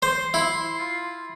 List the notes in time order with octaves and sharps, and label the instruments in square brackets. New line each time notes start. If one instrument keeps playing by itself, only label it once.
[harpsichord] C5 [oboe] C6
[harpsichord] E4
[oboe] F4